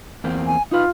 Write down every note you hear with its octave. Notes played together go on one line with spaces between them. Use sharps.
E2 A#3 C4
G#5
D#4 F4 B4